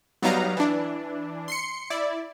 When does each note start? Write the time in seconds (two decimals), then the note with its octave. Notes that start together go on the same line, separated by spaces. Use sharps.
0.22 F#3 G3 B3 D#4 F5 A#5
0.57 E3 D4
1.48 C6 C7 C#7
1.90 E4 D5